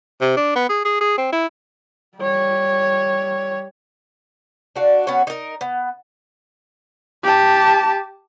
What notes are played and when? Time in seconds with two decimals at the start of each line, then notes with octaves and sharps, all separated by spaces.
0.21 C3
0.37 D4
0.56 B3
0.69 G#4
0.85 G#4
1.01 G#4
1.18 C4
1.32 E4
2.18 G3 C#5
4.76 D4 F#4 F5
5.07 B3 C#4 F#4 C#5
5.27 D#4 A#4
5.61 B3
7.24 G4 A5